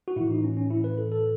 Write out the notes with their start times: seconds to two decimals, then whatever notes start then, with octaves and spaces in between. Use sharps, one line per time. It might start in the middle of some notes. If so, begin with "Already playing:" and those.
0.08 F#4
0.16 A2 E3 E4
0.30 D#4
0.44 C#4
0.57 C#4
0.70 E4
0.84 B4
0.98 A4
1.12 A4